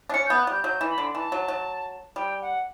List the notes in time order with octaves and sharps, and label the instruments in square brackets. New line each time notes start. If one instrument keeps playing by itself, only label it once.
[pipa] D4
[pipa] C#4 [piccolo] C#7
[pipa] B3 [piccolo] G6
[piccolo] F#6
[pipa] G3 [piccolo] G6
[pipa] F#3 [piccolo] G6
[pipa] E3
[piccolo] B5
[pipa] D3
[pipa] E3 [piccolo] A5
[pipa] F#3
F#3
[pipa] G3 [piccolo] G5
[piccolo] F#5